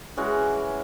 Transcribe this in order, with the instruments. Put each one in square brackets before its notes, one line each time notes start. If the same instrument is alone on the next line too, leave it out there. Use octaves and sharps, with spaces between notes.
[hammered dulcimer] E3 G#3 C#4 F#4